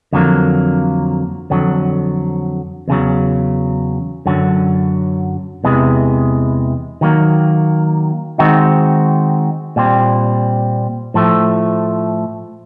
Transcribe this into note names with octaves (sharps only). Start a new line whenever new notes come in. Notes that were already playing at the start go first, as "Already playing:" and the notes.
F2 D3 F#3 A#3
F2 D3 F#3
E2 C#3 F#3
F#2 D3 F#3
E2 C3 E3 G#3
D#3 F#3 A#3
D#3 G#3 C4 D#4 F#4
A#2 G3 C4
A2 F3 A3